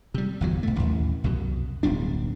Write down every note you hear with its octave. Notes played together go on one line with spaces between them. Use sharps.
C3 G3
G1 E2 F#3
B1 A3
A1 D#2
C2 F#2 B2
D1 B1 G3 D4